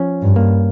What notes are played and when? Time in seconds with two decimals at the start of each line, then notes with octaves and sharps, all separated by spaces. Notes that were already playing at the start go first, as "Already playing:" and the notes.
Already playing: F3 C#4
0.22 G2
0.36 A#3